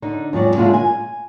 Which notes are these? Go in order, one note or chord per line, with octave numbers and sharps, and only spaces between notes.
D3 D#4
F2 G#2 F#3 D5
A#2 D3 G#3 E4 F4 G#4
G#5